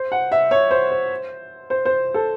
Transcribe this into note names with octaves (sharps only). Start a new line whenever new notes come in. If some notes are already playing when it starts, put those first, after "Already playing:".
Already playing: C5
F#5
E5
C#5
C5
C5
C5
C5
A4